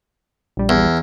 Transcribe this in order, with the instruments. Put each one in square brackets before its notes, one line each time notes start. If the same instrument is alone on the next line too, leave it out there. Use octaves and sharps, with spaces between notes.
[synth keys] A#1 G3
[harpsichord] E2